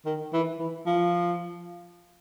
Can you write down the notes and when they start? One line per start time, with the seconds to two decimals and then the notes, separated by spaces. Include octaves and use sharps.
0.06 D#3
0.33 E3
0.59 E3
0.86 F3